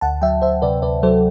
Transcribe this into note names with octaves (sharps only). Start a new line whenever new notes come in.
D2 F#5 A5
F#3 E5 G5
D2 C5 E5
C3 B4 D5
D2 B4 D5
F#3 A4 C5